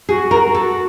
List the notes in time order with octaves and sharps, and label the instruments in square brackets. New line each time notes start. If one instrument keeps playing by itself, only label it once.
[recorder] F#4 [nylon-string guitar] G#4
[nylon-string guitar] A#4
A4